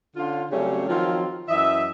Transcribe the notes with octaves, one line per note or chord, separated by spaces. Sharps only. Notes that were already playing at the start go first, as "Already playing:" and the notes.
D3 C#4 D4 F4
C#3 F#3 G3 A3 C4 C#4
D#3 F3 F#3 C4 F4
F#2 E3 D#5 E5